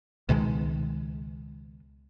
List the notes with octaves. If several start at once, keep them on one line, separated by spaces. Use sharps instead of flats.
C#2 B2 D#3 G#3